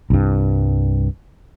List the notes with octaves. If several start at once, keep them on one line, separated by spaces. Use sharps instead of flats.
C2 G2